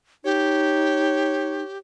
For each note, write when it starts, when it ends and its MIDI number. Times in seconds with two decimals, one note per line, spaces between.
0.25 1.63 63
0.25 1.78 67
0.25 1.79 73